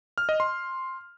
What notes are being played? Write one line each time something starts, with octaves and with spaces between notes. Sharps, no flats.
F6
D#5
C6